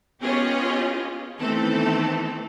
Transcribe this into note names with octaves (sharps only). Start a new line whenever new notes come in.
B3 C#4 F4 G4 G#4 D#5
D#3 E3 A3 B3 C4 A4